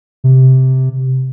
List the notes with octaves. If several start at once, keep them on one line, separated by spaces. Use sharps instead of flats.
C3